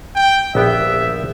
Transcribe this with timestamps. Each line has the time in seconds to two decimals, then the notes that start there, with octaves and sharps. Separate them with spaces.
0.15 G5
0.55 A#1 B3 G4 E5